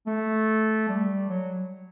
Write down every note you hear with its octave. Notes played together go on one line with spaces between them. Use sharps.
A3
G3
F#3